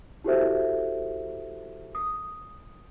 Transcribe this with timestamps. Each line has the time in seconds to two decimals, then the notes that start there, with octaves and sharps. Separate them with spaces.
0.24 E4 F#4 G4 A4 C5 E5
1.95 D#6